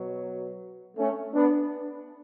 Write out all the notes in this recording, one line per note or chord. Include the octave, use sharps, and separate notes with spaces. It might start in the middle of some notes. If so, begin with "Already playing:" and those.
Already playing: B2 F#3
A3 C#4
B3 D4